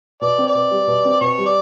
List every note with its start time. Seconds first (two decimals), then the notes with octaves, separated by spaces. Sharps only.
0.21 B2 D5
0.38 C4
0.47 D5
0.55 B2
0.71 G3
0.87 B2
1.04 C4
1.21 B2 C#5
1.38 G3
1.46 D5